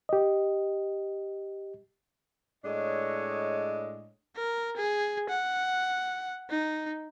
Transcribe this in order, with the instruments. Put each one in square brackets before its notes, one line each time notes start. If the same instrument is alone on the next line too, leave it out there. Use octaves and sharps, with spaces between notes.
[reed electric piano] G4 D#5
[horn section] A2 G#3 D4 C#5 D#5
[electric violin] A#4
G#4
F#5
D#4